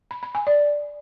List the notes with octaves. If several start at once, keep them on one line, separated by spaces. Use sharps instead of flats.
B5
B5
G#5
D5